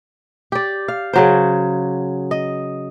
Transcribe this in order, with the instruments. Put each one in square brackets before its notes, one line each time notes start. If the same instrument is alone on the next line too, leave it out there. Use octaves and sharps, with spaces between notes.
[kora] G4 D5
F5
C#3 F#3 C5
D#5